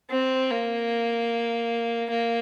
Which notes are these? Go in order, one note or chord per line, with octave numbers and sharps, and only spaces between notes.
C4
A#3
A#3